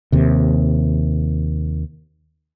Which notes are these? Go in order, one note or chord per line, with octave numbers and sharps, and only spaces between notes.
D#2 C3